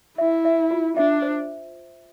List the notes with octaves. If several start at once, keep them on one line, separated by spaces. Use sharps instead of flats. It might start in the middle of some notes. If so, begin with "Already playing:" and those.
E4 E5
E5
F4
D4 E5
C5